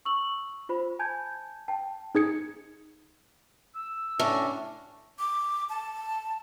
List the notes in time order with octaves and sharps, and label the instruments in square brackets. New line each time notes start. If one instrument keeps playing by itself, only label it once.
[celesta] C#6 E6 F#7
F4 C5 B5
G#5 A5 G6 G#6
G5 A5
[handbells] D#4 G#4 G#6 C#7
[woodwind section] E6
[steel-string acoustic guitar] A2 [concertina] C#4 D4
[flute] D6
A5